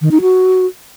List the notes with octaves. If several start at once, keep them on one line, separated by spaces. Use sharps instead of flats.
D#3
D#4
F#4